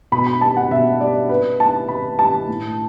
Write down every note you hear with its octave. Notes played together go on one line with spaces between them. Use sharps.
B2 B5
B5
G3 A5
F#5
B2 E5
G3 D5
C3 B4
G3 A5
C3 B5
G3 A5
A2